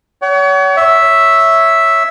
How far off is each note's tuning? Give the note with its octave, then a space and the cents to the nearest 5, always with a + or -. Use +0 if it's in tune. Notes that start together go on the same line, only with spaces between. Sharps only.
C#5 +35 F#5 +40
C#5 +0 E5 +0